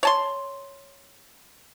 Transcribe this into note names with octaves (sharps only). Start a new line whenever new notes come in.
C#5 A5 C6